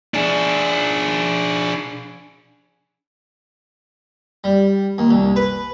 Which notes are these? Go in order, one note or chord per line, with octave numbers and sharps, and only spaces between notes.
D4 G#4
G3
D#2
C2
B4